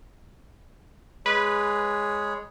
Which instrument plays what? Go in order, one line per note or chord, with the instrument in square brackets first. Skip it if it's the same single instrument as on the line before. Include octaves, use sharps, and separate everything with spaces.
[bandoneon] G#3 G#4 C#5 [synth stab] B4